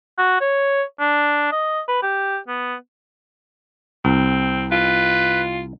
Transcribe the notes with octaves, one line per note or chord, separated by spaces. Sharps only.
F#4
C#5
D4
D#5
B4
G4
B3
C2 C4
F4 B4